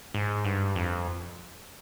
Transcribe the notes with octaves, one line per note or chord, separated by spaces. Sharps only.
G#2
G2
F2